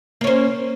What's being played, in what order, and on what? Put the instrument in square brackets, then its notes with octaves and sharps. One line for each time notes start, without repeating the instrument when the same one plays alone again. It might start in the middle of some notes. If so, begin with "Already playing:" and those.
[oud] A#3
C#4
C5